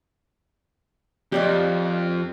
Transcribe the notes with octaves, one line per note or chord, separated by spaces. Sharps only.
F2 G4 D5 D#5